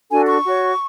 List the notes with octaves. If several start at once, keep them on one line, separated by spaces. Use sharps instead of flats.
D4 F#4 A4 G#5
C#6
F#4 C#5